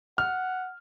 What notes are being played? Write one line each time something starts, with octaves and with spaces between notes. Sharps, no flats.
F#5 F6